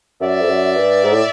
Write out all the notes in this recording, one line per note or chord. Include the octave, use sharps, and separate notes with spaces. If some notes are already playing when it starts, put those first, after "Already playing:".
F#2 D5 E5
F2
F#2
G2
G#2
A2